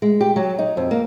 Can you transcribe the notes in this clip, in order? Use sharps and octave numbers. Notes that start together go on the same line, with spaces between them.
G#3
G4
F#3
D#4
F2
A#3